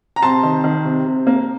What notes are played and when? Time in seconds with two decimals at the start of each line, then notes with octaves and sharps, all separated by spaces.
0.16 A#5
0.22 C3 A5 C6
0.43 D#3
0.64 D#3
0.85 C3
1.06 C3
1.27 A#3